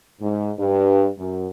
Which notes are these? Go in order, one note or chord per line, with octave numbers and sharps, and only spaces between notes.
G#2
G2
F#2